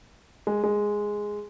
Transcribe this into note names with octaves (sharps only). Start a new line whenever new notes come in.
G#3
G#3